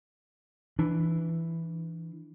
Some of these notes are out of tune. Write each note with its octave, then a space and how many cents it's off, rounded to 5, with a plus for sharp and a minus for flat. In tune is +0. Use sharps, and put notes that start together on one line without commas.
E3 +0 D4 +15